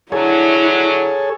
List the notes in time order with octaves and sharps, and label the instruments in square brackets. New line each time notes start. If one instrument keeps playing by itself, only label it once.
[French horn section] D3 F#3 [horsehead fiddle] E4 [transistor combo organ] G#4 A4 C#5